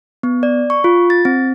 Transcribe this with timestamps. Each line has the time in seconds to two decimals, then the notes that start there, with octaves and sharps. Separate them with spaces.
0.23 B3
0.43 D5
0.70 C#6
0.84 F4
1.10 A6
1.25 C4